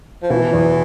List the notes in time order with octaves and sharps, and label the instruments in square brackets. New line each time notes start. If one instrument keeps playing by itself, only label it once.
[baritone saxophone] F3
[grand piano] B2 [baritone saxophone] E3
[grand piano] E2